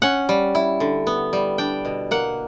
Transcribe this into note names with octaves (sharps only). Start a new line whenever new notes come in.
C#4 F#5
G3
E4
D3
B3
G3
D4 G5
B2
A#3 F#5